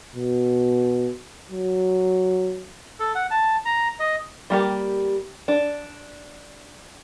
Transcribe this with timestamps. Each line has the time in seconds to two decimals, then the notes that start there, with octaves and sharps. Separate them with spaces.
0.16 B2
1.50 F#3
2.99 A4
3.15 F#5
3.31 A5
3.65 A#5
4.00 D#5
4.50 G3 A#3 G4
5.48 D4